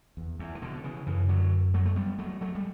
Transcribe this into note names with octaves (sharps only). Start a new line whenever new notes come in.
E2
E2
E3
B2 D3
C#3 E3
F#2 C#3 E3
D3 F#3
F#3 A3
A3
G3 B3
F#3 A3
F#3 A3
G3